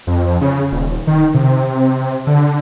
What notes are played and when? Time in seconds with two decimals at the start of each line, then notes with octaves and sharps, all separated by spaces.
0.07 F2
0.41 C#3
0.72 D#1
1.07 D#3
1.34 C3
2.27 D3